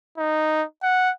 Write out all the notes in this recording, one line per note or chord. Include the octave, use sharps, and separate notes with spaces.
D#4
F#5